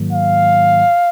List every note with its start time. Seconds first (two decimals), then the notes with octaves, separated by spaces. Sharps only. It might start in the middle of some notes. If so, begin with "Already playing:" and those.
Already playing: G#2 D#3 F#3 A#3
0.12 F5